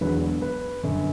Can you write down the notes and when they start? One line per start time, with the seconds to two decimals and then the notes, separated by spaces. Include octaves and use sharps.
0.01 E1 E2 D3 F#3 B4
0.42 B4
0.84 G1 F#2 D3